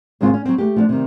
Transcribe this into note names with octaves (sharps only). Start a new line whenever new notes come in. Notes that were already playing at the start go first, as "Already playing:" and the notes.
D#2 G#2 C#3 G#3 C4 F4
C#4
F#3 C4
A3 A#3 G4
F3 C4 D4
C3 D#3